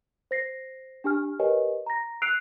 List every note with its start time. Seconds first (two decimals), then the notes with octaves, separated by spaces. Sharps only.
0.31 C5 A#6 C7
1.04 D4 G4 G#5 F6
1.40 G4 A#4 B4 C#5 D#5 G#5
1.86 A#5 A#6
2.22 E6 F#6 C7 D7 D#7 F7